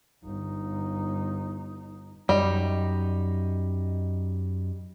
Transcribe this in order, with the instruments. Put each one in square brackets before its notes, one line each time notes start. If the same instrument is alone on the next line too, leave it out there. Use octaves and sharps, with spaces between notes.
[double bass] G1 D#4
[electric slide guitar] F#2 D#4 [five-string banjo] G3